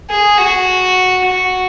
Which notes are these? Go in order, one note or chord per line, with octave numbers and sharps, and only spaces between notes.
G#4
F#4
F#4